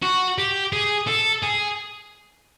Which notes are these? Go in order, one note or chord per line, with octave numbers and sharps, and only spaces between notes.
F#4
G4
G#4
A4
G#4